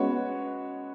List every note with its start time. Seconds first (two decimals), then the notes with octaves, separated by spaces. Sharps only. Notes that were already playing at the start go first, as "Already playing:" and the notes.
Already playing: G#3 B3 C#4 F#4 C#5
0.27 C#4